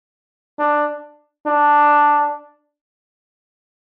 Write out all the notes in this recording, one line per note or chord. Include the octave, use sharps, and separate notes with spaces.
D4
D4